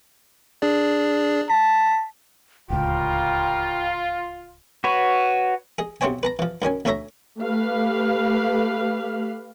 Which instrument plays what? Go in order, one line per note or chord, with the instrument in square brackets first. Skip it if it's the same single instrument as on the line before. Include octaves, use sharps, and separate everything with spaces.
[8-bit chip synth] D4 G#4 D5
[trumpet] A5 [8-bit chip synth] B6
[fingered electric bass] D1 C#2 [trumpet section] G3 C#4 A#4 [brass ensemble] F4 [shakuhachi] G5
[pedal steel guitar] F#4 B4 C#5
[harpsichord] G#4 D#5
B1 C3 C4 C5 C#5 G#5
B4 A5 A#5
E3 F3
F#2 D#3 C#4 G#5
D2 A3 A4 C#5 E5 A#5
[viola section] A3 G4 B4 F5